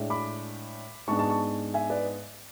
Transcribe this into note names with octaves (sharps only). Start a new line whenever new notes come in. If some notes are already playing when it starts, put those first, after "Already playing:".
Already playing: A2 G#3 D4
B5 D6
G#2 G#3 B3 D4 A5 C#6
A5 C#6
A5 C#6
E5 G#5
B4 D5